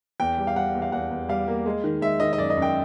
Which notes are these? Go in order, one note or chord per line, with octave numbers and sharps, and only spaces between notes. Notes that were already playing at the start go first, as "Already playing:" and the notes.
E2 G5
G3
F5
G3 F#5
E2
F5
E2 F#5
E2
G3 F5
A#3
G#3
D#3
G#3 E5
D#3 D#5
D#5
F#2 D5
D#5
F#2
G5